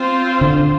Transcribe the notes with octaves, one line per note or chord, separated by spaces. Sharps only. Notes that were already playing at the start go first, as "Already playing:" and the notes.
Already playing: C4 F4 C5
D3